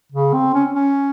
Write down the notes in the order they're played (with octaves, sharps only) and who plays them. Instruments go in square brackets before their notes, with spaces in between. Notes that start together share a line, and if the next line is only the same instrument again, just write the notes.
[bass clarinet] C#3
C4
C#4
C#4